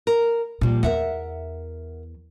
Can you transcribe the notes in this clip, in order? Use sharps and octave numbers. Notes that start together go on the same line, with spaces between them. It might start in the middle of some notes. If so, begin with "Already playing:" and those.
A#4
A#2 F3 G3
E2 A#4 E5 F#5